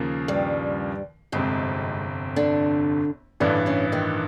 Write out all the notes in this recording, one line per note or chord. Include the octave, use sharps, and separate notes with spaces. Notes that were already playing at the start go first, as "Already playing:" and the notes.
Already playing: D#2 C#3 F3 A#3
G2 G3
G1 F2 G#2 C3 G#3
D3 D4
A1 G2 D3 E3 D4
C#3 C#4
D#3 D#4